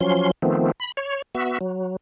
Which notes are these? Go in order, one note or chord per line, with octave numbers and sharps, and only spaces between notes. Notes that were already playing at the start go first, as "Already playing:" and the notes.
F3 F#3 C#4 C6
D#3 F3 A3 B3 C4
B5
C#5
B3 F#4 E5
F#3